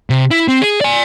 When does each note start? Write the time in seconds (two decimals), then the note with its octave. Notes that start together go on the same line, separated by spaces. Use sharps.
0.10 C3
0.31 E4
0.48 C4
0.62 G#4
0.81 D5 G#5